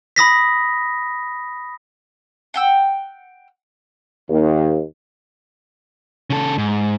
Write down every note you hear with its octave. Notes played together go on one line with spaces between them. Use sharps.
B5 D#6 A#6 B6
F#5 G5 E6
D#2
C#3 A4
G#2